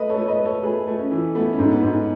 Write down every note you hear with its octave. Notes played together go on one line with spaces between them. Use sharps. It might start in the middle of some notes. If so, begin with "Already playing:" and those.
Already playing: A3 B4 D#5
A4 C#5
A3
C#5
B4 D#5
A3
A4 C#5
A3 G#4 B4
A3
C#4
E3
A3 B3
C#4
G#2
B3
G#2